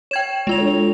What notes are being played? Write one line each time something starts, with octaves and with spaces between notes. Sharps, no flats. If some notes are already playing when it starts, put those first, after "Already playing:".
C#5 G5 G#6 E7
G#3 F4 F7
D4 A4 C#5